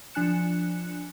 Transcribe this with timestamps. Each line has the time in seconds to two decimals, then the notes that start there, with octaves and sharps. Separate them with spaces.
0.14 F3 D4 G#5 F#6 C#7 E7